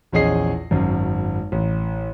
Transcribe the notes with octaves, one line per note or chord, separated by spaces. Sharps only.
A#1 E2 C#4 G#4 D#5 C7
G#1 F#2
A1